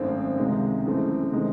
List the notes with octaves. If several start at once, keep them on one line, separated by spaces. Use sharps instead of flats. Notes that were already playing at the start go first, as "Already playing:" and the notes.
Already playing: G#1 F#2 D#3 A3 C4
C#2 C3 D#3 G#3
F#2 E3 A3 C4
C3 D#3 G#3 C4 D#4